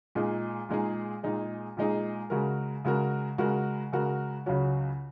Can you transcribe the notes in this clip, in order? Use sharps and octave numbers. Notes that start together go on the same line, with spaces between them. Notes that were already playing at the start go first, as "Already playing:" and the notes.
A#2 G#3 D#4 G#4
A#2 G#3 D#4 G#4
A#2 G#3 D#4 G#4
A#2 G#3 D#4 G#4
C#3 G#3 F#4 A#4
C#3 G#3 F#4 A#4
C#3 G#3 F#4 A#4
C#3 G#3 F#4 A#4
C#2 C#3 F#3 C#4 F#4